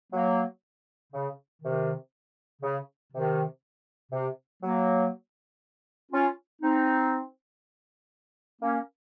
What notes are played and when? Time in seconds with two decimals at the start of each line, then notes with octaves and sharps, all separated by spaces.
0.12 F#3 A#3
1.13 C#3
1.62 C3 D#3
2.62 C#3
3.13 C3 D#3
4.12 C3
4.63 F#3 A#3
6.12 C#4 F4
6.62 C4 D#4
8.62 A#3 C#4